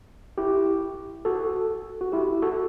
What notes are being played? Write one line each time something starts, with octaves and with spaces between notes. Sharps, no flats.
E4 G4
F#4 A4
F#4
E4 G4
F#4 A4